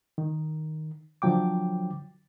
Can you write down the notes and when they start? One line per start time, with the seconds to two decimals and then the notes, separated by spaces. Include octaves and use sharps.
0.18 D#3
1.22 D3 F3 F#3 G5 D6